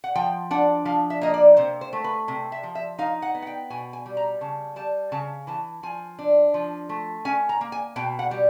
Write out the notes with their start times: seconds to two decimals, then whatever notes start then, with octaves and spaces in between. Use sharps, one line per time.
0.04 F#5
0.15 F3 G5
0.51 D4 F#5
0.85 F3 F5
1.10 E5
1.21 A#3 D#5
1.34 D5
1.57 C3 C5
1.81 C5
1.93 A3
2.04 B4
2.28 C3
2.52 E5
2.63 F3
2.75 E5
2.99 D#4 F5
3.22 F#5
3.35 B3
3.42 F#5
3.47 G5
3.70 B2 G#5
3.93 G#5
4.06 G3
4.17 A#5
4.41 C#3 A5
4.76 G3 A5
5.12 C#3 A5
5.47 E3 A5
5.83 F3 G#5
6.19 D4
6.54 F3
6.89 A3
7.25 C#4 G#5
7.49 A#5
7.61 A#3
7.72 G#5
7.96 B2 G5
8.19 F#5
8.31 G3